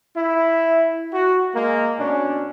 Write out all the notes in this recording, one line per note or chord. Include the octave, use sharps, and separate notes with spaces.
E4
F#4
G#3 A#3
B2 C#4 D4